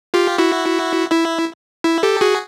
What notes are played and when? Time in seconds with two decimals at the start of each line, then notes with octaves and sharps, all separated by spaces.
0.14 F4 G4
0.38 E4 F#4
1.11 E4
1.84 E4
2.03 G4 A4
2.21 F#4 G#4